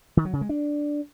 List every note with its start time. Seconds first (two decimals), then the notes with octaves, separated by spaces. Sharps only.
0.17 D#3
0.25 F#3
0.33 C#3
0.41 G#3
0.49 D4